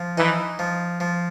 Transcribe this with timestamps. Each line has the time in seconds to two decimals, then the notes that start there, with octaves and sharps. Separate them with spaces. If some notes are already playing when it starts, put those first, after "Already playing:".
Already playing: F3
0.18 E3 D#4
0.59 F3
1.00 F3